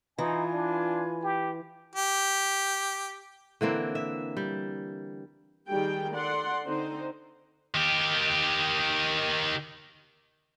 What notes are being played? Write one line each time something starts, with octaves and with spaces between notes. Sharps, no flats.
E3 D#4 F4 G#5
D4
G4
G4
D3 E3 A#3 C4
E5
G3
D#3 G3 G4 G#4 G5
A4 D5 F#5 C6
D3 C4 D#4 C5
D#3 G4